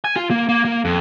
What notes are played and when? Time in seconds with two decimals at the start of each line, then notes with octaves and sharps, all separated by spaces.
0.05 G#5
0.16 F4
0.30 A#3
0.49 A#3
0.65 A#3
0.85 F2